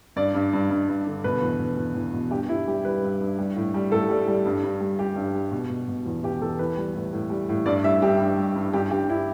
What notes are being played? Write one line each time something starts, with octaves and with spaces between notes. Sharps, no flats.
G2 D5
G2
G2
G2
G2
D3
B2 B4
E2
B2
E2
E2
B2
G2 G4
G3 E4
G3 G4
G3 B4
G2
G2
G3
A2
G3
A2 A4
G3
G3
G2
G2
G3
G3 G4
G2
G3
B2
B2
B2
E2
B2 G4
E2 A4
E3 B4
G3
A2
A2
G3
A2
G2 D5
G3 E5
G2 G4
G2
G3
G2
G2 G4
G2 G4
G2 E4